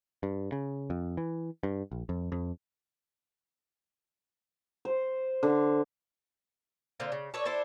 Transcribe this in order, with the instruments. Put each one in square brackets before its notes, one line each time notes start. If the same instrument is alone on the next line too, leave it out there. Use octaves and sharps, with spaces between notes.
[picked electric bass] G2
C#3
F2
E3
G2
A#1
F2
F2
[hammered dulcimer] C5
D3
[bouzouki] D3 A#3 C4 F4
C#3
A4 B4 C#5 D5
D4 E4 A4 C5